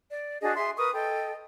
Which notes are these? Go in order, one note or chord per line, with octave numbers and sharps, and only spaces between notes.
D5
D4 F#4 G#4 D#5
G#4 E5 C6
A#4 B4 C#6 D#6
A4 D#5 G5